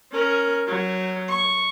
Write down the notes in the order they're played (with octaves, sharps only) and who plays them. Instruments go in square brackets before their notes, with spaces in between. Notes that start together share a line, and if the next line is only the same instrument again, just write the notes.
[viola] C#4 A#4
F#3
C#6